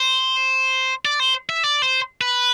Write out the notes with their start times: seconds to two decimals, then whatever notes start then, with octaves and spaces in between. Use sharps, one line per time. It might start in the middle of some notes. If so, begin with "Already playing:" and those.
Already playing: C5
1.05 D5
1.20 C5
1.49 E5
1.64 D5
1.82 C5
2.21 B4